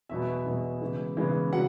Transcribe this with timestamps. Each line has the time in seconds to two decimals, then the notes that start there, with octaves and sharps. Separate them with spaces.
0.09 E2 B2 F#3 B3 E5
0.46 E2 B2 F#3 B3
0.81 C#3 E3 G#3 B3
1.17 C#3 E3 G#3 B3
1.52 C#3 F#3 F#5